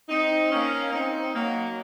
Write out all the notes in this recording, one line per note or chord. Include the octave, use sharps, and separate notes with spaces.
C4 D#4
A#3 C#4
C4 D#4
F#3 A#3